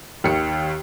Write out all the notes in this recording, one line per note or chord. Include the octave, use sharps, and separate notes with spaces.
D#2 D#3 C#7